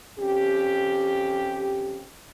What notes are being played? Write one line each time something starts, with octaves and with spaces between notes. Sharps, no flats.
F2 C#4 G4